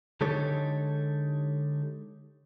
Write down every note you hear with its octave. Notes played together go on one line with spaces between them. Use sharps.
D3 G#3 D#4 G4 A4 C#5